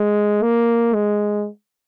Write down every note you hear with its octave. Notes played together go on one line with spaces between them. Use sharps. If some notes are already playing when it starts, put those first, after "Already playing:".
Already playing: G#3
A#3
G#3